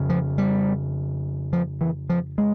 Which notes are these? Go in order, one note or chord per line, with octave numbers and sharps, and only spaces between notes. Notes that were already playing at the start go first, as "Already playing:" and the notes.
Already playing: F2 C#3
F3
G3
F3
E3
F3
G#3